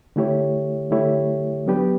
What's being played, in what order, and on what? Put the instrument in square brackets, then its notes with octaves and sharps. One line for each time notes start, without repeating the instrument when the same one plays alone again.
[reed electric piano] D3 A3 E4 G4 C#5
D3 A3 E4 G4 C#5
F#3 B3 D4 G4 B4